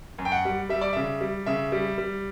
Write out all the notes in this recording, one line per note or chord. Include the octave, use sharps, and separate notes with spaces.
F#2
G5
F#5
G3
G3 E5
D5
C#3 E5
G3
C#3 E5
G3
G3